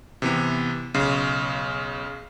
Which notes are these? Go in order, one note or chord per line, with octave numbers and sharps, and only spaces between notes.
C3 E3 B3
B1 C#3